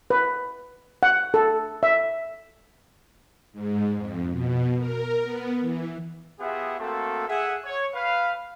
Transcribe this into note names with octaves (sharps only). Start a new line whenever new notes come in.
B4
F#5
A4
E5
G#2
F2
B2
A#4
B3
E3
B3 F4 G4 G#4 E5 F#5
A3 A#3 C4 F#4 A4
G#4 E5 F#5
C#5
B4 F5